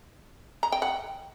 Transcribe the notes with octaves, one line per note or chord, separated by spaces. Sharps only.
A#5
G5
F#5